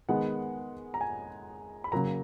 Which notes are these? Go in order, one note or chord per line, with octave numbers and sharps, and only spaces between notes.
D#3 G#3 B3 F#5
A#5
G#5
B5
C#3 F#3 A#3 A#5